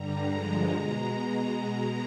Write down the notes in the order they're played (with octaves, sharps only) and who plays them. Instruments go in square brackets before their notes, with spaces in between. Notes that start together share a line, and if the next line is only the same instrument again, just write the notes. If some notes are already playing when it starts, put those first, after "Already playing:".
Already playing: [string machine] G2 D3 G3 A#5
G2 D3 F3 G#3 A#5
B2 G#3